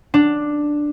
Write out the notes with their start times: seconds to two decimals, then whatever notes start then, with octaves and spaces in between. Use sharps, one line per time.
0.14 D4